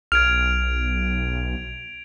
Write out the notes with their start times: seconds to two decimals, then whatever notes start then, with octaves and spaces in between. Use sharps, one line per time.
0.12 B1 F6 G#6 D7 F7